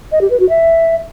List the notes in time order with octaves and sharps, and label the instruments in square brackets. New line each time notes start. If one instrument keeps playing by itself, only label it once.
[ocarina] D#5
G4
B4
F#4
E5